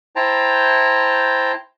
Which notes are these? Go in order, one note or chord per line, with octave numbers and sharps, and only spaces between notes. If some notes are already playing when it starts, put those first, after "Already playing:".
E4 C5 G5 A5 A#5